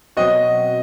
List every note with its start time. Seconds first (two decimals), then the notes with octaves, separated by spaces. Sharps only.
0.17 B2 F#3 C4 F#4 D#5